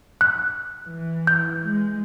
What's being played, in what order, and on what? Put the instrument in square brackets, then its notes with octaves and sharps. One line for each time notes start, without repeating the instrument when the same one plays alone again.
[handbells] F#6
[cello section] E3
[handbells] G6
[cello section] G#3